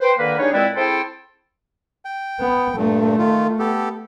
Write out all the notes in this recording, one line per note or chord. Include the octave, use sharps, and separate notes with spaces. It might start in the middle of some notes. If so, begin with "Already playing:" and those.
B4 C5 G5
D3 D#3 A#3 A#4 B4
G3 D4 D#4 G#4 C#5
A#2 G#3 C4 E4 B4 D5
C4 E4 G#4 A4 C5 G5
G5
B3
G2 A#2 A3
D#3 F4
B3 G4 A4